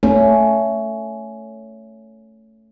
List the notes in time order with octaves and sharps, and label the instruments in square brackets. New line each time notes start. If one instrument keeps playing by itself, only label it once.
[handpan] A3 C#4